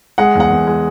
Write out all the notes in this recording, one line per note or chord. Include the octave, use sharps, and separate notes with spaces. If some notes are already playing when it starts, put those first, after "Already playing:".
G#3 F#5
E2 F#5
E2
G#3